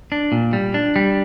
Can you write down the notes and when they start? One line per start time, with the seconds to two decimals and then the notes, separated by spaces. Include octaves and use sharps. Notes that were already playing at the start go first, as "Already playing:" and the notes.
0.12 D4
0.32 A#2
0.53 G3
0.74 D4
0.96 G3